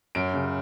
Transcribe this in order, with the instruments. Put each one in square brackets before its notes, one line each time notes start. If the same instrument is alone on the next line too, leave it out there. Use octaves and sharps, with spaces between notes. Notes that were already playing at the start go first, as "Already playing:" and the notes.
[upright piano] F#2 D7
C#3